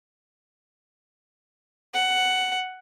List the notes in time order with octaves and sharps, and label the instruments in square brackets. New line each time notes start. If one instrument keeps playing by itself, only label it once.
[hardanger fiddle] F#5